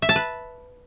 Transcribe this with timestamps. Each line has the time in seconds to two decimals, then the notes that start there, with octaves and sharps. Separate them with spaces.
0.02 E5
0.09 A5
0.16 B4